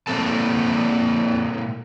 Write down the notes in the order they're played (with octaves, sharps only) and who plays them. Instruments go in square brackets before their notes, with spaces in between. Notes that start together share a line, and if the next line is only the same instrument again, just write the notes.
[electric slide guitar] A#2 E3 A#3 C4 A4 A5